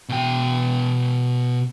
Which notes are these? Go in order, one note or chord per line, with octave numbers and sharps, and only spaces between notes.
B2 G5